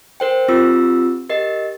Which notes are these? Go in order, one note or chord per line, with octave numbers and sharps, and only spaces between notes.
A#4 C5 G5
C4 F4 G4 E6
G4 A#4 D#5